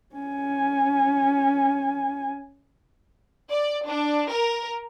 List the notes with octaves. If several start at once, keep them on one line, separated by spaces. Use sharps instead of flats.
C#4 G#5
D5
D4
A#4